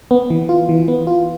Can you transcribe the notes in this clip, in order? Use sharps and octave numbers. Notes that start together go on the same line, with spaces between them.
B3
E3
F4
E3
B3
F4